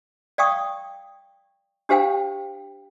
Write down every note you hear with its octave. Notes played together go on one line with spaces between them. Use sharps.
D5 F5 G5 C#6 D#6
D4 G4 C5 F5 G5